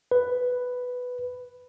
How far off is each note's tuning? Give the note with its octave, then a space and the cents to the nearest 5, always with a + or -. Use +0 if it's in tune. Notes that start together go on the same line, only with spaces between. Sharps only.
B4 +5